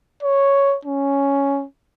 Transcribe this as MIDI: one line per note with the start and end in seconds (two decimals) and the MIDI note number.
0.23 0.76 73
0.85 1.65 61